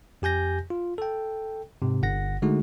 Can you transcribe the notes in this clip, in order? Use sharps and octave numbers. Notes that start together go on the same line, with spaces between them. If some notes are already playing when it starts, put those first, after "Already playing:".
F2 G4 G#5 G6 A#6
F4
A4 G5
G#2 C3
G1 F#5 A#6
D3 G#3 A3 D#4 F#4